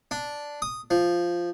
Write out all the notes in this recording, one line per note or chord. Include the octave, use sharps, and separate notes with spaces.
D4
D#6
F3